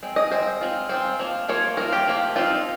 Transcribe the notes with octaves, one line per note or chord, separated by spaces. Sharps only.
G#3 C4
D#5
G#3 C4 F4 C5
G#3 C4 F4
G#3 C4 F4 C5
F3 A#3 F4
F3 A#3 F4 C#5
F3 A#3 F4 A#4
G4
F3 A#3 F4
F3 C4 D#4 F4